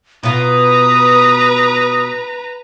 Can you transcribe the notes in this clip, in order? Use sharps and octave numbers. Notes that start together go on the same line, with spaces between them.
B2 F4 B4 A#5 D#6